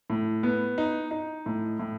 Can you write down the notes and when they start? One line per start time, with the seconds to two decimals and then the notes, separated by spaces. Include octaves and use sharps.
0.10 A2
0.43 B3
0.78 D#4
1.11 D#4
1.46 A2
1.79 A2